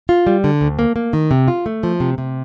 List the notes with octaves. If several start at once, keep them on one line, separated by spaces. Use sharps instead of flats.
F4
G3
D3
D2
A#3
A#3
D#3
C3
F4
A3
F3
C3
C3